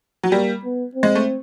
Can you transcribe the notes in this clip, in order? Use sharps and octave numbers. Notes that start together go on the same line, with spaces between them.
F#3
G3 A#3
B3
C4
G#3
A3